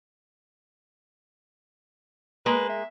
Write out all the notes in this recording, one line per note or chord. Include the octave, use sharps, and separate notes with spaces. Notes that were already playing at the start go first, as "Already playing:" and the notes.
G#3 A#3 B4
E5